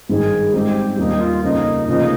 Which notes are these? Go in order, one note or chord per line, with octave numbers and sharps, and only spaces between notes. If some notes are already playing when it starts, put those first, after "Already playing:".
G#1 G2 D#3 G#3 D#4 G#4
G#2 G3 C4 D#4 G4
D#2 D#3 G3 A#3 D#4
F4
F2 C#3 F3 A#3 D#4
F1 F2 C#3 F3 A#3 D#4